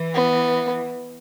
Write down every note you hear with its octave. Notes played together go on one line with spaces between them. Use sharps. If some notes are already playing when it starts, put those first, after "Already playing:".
Already playing: E3
B3